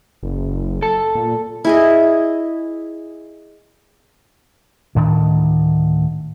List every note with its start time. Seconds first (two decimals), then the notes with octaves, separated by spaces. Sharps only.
0.23 F#1
0.82 A4 A5
1.15 A#2
1.64 E4 G#4 D#5
4.95 D2 A2 D#3 D4